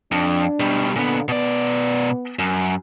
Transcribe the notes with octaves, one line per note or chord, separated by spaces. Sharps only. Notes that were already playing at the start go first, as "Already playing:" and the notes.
F2 D4
B2 G3
A#2 D3 B3
B2 B3 D5
F#2